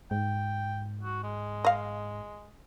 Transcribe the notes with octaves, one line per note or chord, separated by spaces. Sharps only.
G#2 G5
F#4
G#3
D#5 F5